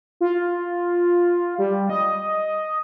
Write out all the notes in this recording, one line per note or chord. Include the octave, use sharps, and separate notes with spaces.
F4
G3
D#5